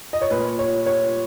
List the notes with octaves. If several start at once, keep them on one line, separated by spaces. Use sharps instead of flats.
D#5
C#5
A#2 B4
C#5
C#5